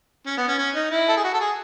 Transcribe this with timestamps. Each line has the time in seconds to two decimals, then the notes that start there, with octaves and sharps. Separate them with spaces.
0.26 C#4
0.37 B3
0.48 C#4
0.58 C#4
0.75 D#4
0.91 E4
1.09 A4
1.17 G#4
1.24 F#4
1.33 A4
1.40 G#4